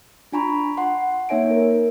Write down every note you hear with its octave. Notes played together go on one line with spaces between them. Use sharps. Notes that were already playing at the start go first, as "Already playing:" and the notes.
D4 F4 G#5 A#5 B5 C#6
F#5 C6
A#3 D#4 C#5 E5 G#5 D7
A#4